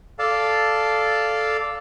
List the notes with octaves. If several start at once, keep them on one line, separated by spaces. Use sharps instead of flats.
A4 D5 F5 A5